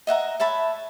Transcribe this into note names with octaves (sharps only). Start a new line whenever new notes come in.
D#5 E5 F#5 A#5
C#5 E5 A5 B5